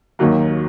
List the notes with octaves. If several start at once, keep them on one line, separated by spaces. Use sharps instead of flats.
D#2 D#3 F#3 A#3